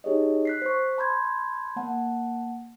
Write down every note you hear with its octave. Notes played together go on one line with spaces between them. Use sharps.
D#4 G4 G#4 C#5 D#5
F#6 B6 C7
C5 C#6
A5 B5 C6 G6 G#6
A#3 F#5 A5